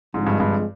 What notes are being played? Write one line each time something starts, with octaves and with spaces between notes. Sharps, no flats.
G#2 D3 F3 G#3 C4
G2
G2